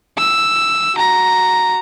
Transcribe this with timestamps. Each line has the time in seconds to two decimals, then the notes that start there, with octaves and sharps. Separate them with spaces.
0.18 E6
0.95 F#4 A#5